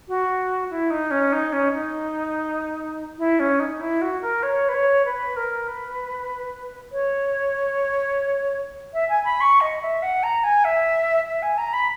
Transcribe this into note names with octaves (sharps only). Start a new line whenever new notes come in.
F#4
E4
D#4
C#4
D#4
C#4
D#4
E4
C#4
D#4
E4
F#4
A#4
C#5
B4
C#5
B4
A#4
B4
C#5
E5
G#5
B5
C#6
D#5
E5
F#5
A#5
G#5
E5
E5
G#5
A#5
B5